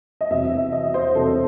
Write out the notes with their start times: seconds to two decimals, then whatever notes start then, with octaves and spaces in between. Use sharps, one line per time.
0.21 D#5
0.30 E2 C3 F#3 E5
0.52 E5
0.72 D#5
0.94 C5
1.15 E2 C3 F#3 A4